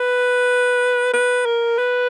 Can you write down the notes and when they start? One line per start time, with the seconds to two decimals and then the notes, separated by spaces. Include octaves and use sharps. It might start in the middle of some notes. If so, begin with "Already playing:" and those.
Already playing: B4
1.13 B4
1.46 A#4
1.78 B4